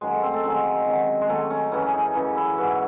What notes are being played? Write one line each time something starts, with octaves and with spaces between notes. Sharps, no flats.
F#2 D#3 F#3 G#3
A3
C4
A3
F#2 D#3 F#3 G#3
C3 D#3 F#3
G#3
C3 D#3 F#3 A3
C#4
F#2 C#3 E3 C#4
D#4
F#2 C#3 E3 D#4
E4
G#2 E3 F#4